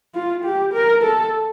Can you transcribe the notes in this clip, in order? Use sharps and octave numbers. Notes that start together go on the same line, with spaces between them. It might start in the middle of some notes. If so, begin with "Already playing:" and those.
F4
G4
A#4
A4